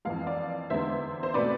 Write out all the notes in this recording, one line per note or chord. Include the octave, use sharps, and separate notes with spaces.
F2 E3 G#3 F5
D5 F5
E2 D3 G#3 B3 C5 E5
C5
B2 A3 C4 B4 D5